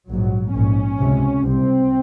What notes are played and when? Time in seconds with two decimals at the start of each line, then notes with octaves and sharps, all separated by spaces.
0.09 A#1 G#2 F#3
0.53 A#1 G#2 C#4
0.98 C#2 C3
1.43 C2 C3 C4